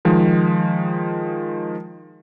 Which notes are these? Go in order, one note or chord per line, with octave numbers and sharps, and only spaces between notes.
D#3 F3 G#3